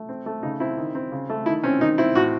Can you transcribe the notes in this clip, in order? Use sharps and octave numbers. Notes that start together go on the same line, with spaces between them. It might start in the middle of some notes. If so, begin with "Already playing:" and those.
Already playing: A3
C4
A3
C#3 D#4
C4 E4
D#3
C4
C#3
A3
D#3 E4
C4 C#4
D#3 D#4
C4 E4
A2 F#4